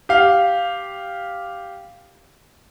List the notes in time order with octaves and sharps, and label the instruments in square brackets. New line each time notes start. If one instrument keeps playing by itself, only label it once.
[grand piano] G4 F5